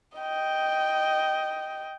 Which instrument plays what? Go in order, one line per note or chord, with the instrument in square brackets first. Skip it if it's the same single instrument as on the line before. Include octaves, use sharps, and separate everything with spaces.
[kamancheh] D#5 G5